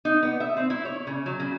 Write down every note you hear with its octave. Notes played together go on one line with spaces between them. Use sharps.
D#4
B3
E5
C4
E4
C#5
C#3
F#3
C#3